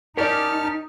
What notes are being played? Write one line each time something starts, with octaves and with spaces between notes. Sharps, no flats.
C#4 D#4 G4 A#4 D5 A5 F6